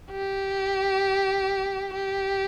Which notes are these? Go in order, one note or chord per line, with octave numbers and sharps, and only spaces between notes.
G4
G4